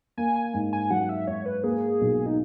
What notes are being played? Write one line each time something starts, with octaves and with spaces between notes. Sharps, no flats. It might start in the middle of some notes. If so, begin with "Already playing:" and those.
A#3 G#5
G#5
G#2
G#5
F#3 F#5
E5
G#2 C#5
B4
A#3 G#4
B1
D#4